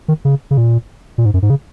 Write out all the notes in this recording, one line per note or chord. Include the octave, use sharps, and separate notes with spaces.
D#3
C#3
C#3
A#2
A#2
G#2
F#2
G#2
C#3